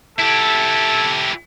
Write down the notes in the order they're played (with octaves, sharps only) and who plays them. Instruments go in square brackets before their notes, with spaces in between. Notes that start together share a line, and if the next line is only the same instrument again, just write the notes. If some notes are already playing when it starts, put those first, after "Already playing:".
[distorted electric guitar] E4 G4 [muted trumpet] A4